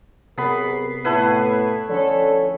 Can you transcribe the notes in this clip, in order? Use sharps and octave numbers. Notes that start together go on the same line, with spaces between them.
C3 F#3 B3 G#4 A#4 B5 C7
A2 A3 B3 E4 B4
D3 F3 C#4 D4 A4 C#5